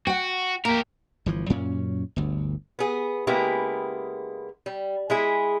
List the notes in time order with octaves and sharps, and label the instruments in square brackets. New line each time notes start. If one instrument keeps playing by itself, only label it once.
[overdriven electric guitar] F#4 [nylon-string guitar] F#5 G5
[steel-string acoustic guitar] A#3 [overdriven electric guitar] G4 A#4
[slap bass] G1 E3 F3
F#2 A#2 C#4
G1 D2
[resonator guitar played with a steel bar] B3 G#4
C#3 G#3 A#3 B3 E4 G4
G3
G#3 E4 G#4